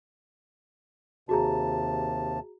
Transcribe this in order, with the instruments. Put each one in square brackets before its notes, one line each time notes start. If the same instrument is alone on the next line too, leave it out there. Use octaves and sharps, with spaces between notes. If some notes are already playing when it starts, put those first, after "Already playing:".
[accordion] D#2 C3 A5 [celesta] F#4 G#4 A#5